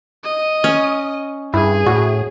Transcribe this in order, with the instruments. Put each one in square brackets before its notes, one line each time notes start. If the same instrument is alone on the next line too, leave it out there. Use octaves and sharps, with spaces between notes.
[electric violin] D#5
[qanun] C#4
[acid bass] G2 [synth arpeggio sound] E4 [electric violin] G#4
[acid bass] A2 [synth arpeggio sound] F#4